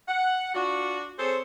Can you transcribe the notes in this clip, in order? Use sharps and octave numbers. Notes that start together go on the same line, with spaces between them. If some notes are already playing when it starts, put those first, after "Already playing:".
F#5
D4 F4 F#4
C4 G#4 A4 C5 C#5